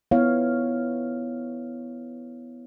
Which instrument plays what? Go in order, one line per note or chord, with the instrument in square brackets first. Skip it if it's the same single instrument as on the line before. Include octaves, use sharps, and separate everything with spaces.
[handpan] B3 E4 C#5 F5